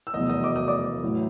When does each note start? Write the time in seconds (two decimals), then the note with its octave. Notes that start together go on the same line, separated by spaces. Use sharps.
0.07 E6
0.14 F1 E2 B2 F#3 D#5 D#6
0.29 D#5 D#6
0.44 D6
0.56 D#6
0.68 D5 D6
1.03 A1 A2 F#3